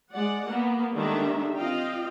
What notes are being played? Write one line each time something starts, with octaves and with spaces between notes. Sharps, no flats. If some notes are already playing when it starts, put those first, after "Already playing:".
G#3 D5 F#5
A#3 B3
D3 D#3 G3 G#3 D4 E5
C4 F4 D#5 F5 G5